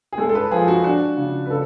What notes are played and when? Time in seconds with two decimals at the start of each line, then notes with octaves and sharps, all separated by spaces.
0.13 G#4
0.18 G#3 A4
0.29 A4
0.35 B4
0.51 F3 G#4
0.68 F#4
0.84 D4 F#4
1.17 C#3
1.46 B4
1.50 C#3 A4